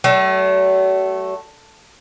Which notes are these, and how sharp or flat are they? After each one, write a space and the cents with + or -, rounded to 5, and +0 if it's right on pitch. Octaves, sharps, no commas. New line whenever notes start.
F#3 +45 A3 +0